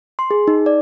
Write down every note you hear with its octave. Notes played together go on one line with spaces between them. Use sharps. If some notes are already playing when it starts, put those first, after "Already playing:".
C6
G#4
D#4
D5